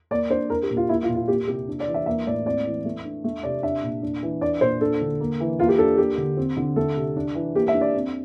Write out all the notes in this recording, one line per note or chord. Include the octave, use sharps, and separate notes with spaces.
A#3 D5
D4 C5
D4 A#4
G4
A#2
F4
A#3 E4
F4
A#2
F4
A#3 G4
C3 G4
D4
D5
E3
E5
A#3 E5
A2 D5
C4 D5
E3
A3
D4
A3
C3 D5
D4 E5
A#2
D4
E3
D4 D5
A#2 C5
D4 A4
D3
A#3
E3
A#3 F4
G4
D4 A4
A#3 G4
D3
C4
D3
A3 A4
C3
D4
E3
A#3 G4
E5
D4
D5
C4